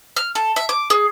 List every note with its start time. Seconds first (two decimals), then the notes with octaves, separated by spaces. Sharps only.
0.16 F6
0.35 A4
0.56 E5
0.69 D6
0.90 G#4